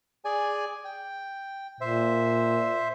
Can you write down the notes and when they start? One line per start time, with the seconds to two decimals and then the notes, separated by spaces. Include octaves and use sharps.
0.25 G#4 D5 G#5
0.85 G5
1.81 A#2 C5 E5